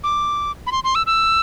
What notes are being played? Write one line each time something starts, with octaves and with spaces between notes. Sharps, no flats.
D6
B5
C6
C6
E6
E6